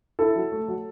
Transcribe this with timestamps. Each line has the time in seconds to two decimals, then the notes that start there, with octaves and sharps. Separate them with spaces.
0.19 E4 A4
0.36 F#3
0.52 A3
0.68 F#3